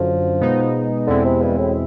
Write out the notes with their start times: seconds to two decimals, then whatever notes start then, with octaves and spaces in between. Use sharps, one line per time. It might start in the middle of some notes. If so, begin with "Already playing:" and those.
Already playing: F#2 D3 F3 F#3
0.40 B2 G#3 B3 D#4
1.07 E2 B2 D3 G#3 C4 E4
1.25 C3
1.42 G2
1.58 A2